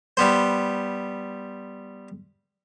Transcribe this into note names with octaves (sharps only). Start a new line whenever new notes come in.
G3 B3 C5